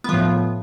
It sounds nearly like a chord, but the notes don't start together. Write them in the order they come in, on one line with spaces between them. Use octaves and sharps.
B3 F3 A2